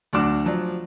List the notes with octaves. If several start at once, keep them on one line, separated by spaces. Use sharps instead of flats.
D2 F#3 D4 F#4 D6 E7
F3 F#3 D5